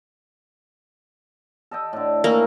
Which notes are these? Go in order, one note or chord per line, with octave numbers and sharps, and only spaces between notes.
A4 D#5 G5
A2 D3
E3 A3 A#3 D#4